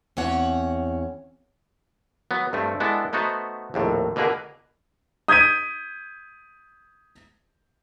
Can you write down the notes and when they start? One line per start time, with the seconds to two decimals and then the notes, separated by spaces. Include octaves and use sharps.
0.17 E2 C4 C#4 C#5 F#5
2.31 F#3 B3
2.53 G2 A3 C4
2.80 G#3 B3 D4 E4 A4
3.13 A3 B3 D#4 F#4 C5
3.74 A#1 D#2 A2 C3
4.16 B2 D3 A#3 G#4 A#4 B4
5.28 D#6 G6 G#6 B6 D#7